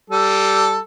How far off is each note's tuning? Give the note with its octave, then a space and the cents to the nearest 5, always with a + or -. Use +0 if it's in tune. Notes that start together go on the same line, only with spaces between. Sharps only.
G3 -10 A4 +5